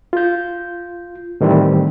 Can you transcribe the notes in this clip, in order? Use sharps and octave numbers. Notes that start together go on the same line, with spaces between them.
F4 G6
A2 D#3 E3 G3 C4